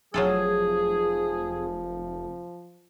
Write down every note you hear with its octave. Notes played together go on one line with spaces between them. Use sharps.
F1 F3 F#3 F4 G#4 A4